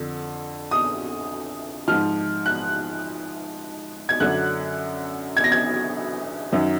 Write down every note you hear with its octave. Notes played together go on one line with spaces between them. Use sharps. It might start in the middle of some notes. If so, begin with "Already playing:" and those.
Already playing: F2 D3
D#6
G#2 F3 F6
F#6
G#6
F#2 D3 F#3 F#6
G#6
A#6
G#6
F#2 D#3 F#3